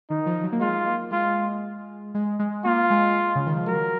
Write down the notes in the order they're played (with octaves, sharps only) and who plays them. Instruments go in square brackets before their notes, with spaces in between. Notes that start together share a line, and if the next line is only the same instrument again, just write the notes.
[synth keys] D#3 [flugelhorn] D#4
[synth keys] F3
F#3
A#3
[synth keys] G#3 [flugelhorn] F4
[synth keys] A#3
[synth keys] G#3 [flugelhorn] F4
[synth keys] G#3
G#3
[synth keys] A#3 [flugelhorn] F4
[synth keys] G#3
C#3
D#3
F3
[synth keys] F#3 [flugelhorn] A#4